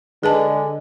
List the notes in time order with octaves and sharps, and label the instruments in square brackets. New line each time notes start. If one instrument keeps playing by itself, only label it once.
[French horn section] D3 G#3 [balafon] G#4 B4 A5